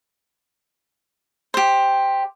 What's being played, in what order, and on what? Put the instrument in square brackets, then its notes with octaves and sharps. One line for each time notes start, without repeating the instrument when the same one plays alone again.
[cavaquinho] G4 C5